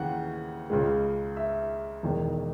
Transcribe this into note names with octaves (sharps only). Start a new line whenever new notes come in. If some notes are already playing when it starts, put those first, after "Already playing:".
Already playing: D#2 C#3 E3 F#5
C#2 C#3 G#3
E5
E1 E2 D#3 G#3